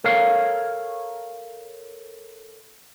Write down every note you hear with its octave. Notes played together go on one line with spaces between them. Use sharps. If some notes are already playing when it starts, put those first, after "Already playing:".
A4 A#4 C#5 F5